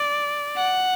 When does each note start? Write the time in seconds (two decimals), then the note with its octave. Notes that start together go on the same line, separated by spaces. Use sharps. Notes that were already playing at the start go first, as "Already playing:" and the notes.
Already playing: D5
0.57 F#5